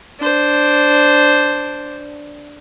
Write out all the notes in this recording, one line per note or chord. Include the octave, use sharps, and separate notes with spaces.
D4 C5